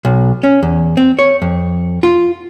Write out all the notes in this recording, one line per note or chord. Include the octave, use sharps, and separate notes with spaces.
B1
C#4
E2
C4
C#5
F2
F4